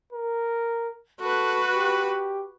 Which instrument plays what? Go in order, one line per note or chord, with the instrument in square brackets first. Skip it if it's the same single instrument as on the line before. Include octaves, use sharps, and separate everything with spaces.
[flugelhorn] A#4
[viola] F#4 B4 [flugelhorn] A4
[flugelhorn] G4